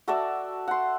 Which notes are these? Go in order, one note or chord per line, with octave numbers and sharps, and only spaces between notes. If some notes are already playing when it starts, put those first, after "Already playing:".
F#4 A4 D5 E5
F#5 C6